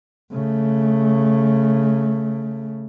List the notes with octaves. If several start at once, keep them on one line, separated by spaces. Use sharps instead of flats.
C#3 A3